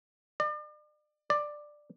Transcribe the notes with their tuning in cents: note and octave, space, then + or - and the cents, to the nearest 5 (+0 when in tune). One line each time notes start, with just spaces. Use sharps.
D5 +40
D5 +10